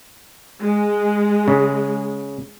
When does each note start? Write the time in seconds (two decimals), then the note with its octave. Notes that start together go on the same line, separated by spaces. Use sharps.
0.62 G#3
1.48 C#3